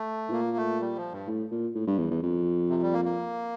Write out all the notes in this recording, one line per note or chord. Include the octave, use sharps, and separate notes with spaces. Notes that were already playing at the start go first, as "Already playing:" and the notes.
Already playing: A3
A2
A#2 A#3
A3
G3
F3
G2
A2
A#2
A2
G2
E2
E2
F2
C3
G3
A#3
A#3